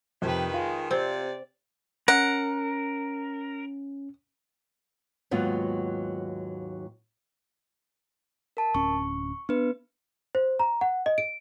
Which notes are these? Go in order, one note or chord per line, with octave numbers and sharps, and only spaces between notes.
F2 C3 D#3 G4 B4
G#3 F4
C3 C4 D5
C#4 A#4 F#5
D#2 G#2 F#3 B3 F4
A#4 A5
D1 C#4 C#6
B3 D4 B4
C5
A#5
F#5
D#5
D7